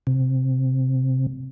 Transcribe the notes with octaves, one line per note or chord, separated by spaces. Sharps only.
C3